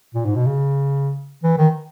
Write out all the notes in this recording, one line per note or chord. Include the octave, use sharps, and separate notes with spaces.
A#2
G#2
B2
C#3
E3
D#3